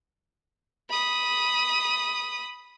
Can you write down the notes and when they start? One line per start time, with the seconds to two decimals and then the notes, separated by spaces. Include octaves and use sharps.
0.90 B5 D#6